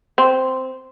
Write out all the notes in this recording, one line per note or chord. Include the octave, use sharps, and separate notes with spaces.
C4